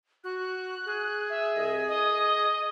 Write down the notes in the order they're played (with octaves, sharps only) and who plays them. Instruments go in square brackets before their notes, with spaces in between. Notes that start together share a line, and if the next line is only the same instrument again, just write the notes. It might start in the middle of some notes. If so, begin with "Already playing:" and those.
[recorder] F#4 [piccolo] F#6
[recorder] G#4
[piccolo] E5
[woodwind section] C2 D#5
[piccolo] D#5 [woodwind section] D#6